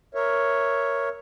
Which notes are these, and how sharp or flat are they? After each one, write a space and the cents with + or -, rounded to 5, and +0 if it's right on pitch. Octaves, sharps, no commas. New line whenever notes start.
A#4 +5 C#5 +0 E5 +0